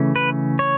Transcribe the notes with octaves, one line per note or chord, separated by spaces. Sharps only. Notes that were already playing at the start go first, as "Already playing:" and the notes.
Already playing: C#3 E3 A3 C#4
B4
C#5